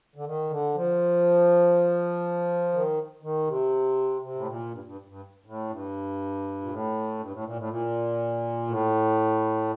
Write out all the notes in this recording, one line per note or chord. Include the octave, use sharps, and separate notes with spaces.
D3
D#3
D3
F3
D#3
D#3
C3
C3
A2
A#2
G2
G2
G2
A2
G2
A#2
A2
G2
A2
A#2
A2
A#2
A2